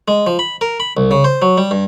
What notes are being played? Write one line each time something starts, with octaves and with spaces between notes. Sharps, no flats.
G#3
F3
B5
A#4
B5
C2
C#3
C5
F#3
G3
G2